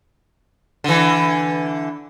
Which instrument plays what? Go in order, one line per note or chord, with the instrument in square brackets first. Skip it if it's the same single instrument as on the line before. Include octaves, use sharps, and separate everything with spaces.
[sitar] D3 E3